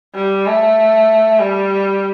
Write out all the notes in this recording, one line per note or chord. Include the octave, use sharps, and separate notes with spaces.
G3
A3
G3